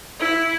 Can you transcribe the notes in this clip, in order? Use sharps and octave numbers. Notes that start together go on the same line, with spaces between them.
E4